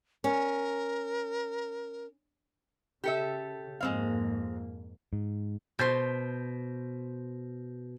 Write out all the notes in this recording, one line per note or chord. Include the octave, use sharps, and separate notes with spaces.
C#4 A#4
C#3 G4 A4 E5
F2 G#2 G#3 A#3 C4 F5
G#2
B2 C5 A5 C6 G6 B6